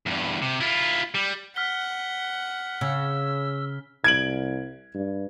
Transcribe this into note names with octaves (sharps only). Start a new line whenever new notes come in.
E2 G2
C3
E4 F4
G3
F#5 F6 B6 G7
C#3 E6
C2 G#6 D7 F#7
G2